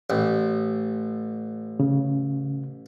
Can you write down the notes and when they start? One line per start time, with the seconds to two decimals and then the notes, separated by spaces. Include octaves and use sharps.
0.10 A1
1.80 C#3